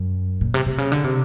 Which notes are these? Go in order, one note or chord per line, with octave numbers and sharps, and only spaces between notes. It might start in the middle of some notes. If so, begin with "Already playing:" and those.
Already playing: F#2
A#2
C3
C3
C#3
D3
C3